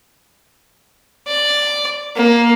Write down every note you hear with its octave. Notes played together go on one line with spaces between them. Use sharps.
D5
A#3